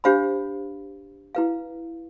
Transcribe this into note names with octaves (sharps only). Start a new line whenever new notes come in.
D4 G4 C5 F5 B5
E4 B4 F5